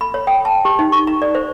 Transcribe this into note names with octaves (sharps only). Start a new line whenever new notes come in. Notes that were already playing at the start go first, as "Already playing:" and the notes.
B5
C#5
G5
A5
G4
D#4
C#6
A#5
D5
C5